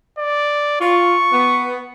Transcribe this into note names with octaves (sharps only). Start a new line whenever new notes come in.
D5
F4 C#6
B3